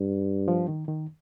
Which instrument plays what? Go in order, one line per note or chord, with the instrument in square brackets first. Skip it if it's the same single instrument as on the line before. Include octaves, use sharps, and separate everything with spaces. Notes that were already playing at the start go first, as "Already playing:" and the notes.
Already playing: [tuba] G2
[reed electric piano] F3
D#3
D#3